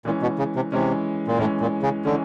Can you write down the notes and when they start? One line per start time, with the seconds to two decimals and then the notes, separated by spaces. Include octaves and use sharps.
0.05 A#2 E3 G#3 C#4
0.22 B2
0.39 C#3
0.56 C3
0.72 C3 E3 G#3 C#4
1.28 A#2
1.38 A2 E3 G#3 C#4
1.61 A#2
1.83 C#3
2.05 D3 E3 G#3 C#4